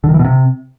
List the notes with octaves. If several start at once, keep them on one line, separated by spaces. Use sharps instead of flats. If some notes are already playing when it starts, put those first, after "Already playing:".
D3
D#3
E3
B2
C3